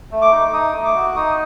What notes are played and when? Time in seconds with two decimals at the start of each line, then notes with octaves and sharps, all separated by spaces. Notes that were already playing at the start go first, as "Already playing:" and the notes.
0.12 A3
0.22 D6
0.32 D#4
0.53 D#4 D#6
0.74 A3
0.84 D6
0.95 F#4
1.16 D#4 D#6